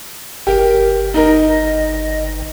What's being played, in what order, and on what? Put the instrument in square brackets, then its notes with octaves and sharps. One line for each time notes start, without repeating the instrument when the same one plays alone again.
[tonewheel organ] G1 [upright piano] G4 [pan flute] A#4
[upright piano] D#4 A#4 [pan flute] D#5